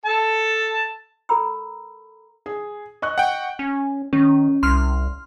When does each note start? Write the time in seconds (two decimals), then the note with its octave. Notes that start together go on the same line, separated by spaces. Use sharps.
0.06 A4 A5
1.29 A4 A#4 A#5 B5 E6
2.46 G#4
3.02 D#5 C#6 F#6
3.18 F#5 G5
3.59 C#4
4.13 D#3 C#4
4.63 C2 C6 F6